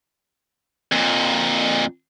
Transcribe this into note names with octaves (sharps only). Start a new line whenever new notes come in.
F2 A#2